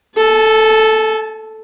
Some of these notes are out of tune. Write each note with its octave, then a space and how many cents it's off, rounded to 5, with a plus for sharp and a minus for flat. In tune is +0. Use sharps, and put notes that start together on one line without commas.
A4 +0 G#5 +45